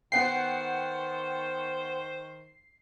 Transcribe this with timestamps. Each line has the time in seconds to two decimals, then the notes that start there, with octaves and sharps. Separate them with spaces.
0.12 D#3 B3 C5 F#5 G5 C7